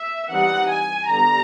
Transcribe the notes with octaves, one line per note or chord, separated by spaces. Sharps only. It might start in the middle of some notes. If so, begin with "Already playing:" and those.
Already playing: E5
E3 G3 C4 D#4 F#5
G#5
D3 G3 B3 A#5